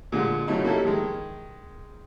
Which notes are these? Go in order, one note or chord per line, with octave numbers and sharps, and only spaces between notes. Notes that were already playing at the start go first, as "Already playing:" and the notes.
A#2 D3 G#3
C#3 F#3 A3 D#4 E4
A#3 C#4 E4 G4 A4 A#4
D#3 G#3